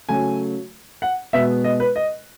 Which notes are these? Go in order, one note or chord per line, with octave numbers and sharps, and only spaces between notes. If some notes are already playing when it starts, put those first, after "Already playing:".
C#3 F#3 A3 G#5
F#5
B2 G#3 B3 E5
D#5
B4
D#5